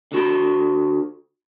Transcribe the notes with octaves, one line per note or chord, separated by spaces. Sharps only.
D3 F#4 B5